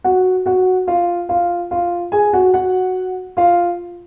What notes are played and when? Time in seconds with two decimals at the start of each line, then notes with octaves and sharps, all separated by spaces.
0.04 F#4 F#5
0.46 F#4 F#5
0.87 F4 F5
1.29 F4 F5
1.71 F4 F5
2.12 G#4 G#5
2.33 F#4 F#5
2.54 F#4 F#5
3.37 F4 F5